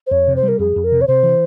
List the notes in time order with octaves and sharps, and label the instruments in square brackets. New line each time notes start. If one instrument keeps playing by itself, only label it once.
[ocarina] C5
[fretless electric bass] F2 [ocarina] C#5
[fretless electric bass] C3
[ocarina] C5
[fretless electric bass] G3
[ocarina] A#4
[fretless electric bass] F2 [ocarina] G#4
[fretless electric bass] F2
[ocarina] A#4
[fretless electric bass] C3
[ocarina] C#5
[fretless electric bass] C3 [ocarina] C5
[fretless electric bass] E3